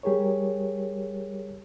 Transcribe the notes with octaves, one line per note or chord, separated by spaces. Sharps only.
G3 G4 G#4 A#4 C#5